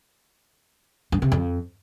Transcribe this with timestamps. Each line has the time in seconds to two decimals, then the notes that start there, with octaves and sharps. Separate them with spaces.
1.12 G2
1.22 C3
1.32 F2